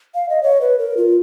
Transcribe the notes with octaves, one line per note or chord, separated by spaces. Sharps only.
F5
D#5
C#5
B4
A#4
F4